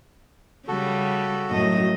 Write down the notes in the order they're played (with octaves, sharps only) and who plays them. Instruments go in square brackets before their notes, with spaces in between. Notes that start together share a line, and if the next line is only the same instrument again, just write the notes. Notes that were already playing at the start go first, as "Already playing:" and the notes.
[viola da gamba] C#3 G3 [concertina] F#4 A4
[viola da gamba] F#2 A2 D#5